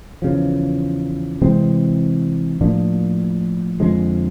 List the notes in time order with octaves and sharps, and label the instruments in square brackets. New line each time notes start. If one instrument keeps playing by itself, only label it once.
[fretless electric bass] E2 C#3 F3
C3 E3 G#3 C4
A2 F3 A#3 D4
F2 D3 F3 G#3